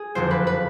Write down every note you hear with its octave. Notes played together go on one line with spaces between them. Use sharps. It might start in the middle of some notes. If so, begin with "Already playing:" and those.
Already playing: G#4
F#1 F2 D3 C5
B4
B4